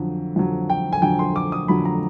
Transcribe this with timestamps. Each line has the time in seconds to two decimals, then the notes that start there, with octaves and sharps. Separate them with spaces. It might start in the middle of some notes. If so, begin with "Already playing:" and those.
Already playing: F2 D3 F#3
0.36 F2 D3 F#3
0.70 G5
0.93 G#5
1.02 F2 D3 F#3 G5
1.19 C6
1.36 D6
1.52 D#6
1.68 F2 D3 F#3 B5
1.85 A#5